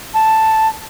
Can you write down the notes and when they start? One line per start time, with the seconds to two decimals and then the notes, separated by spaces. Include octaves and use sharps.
0.14 A5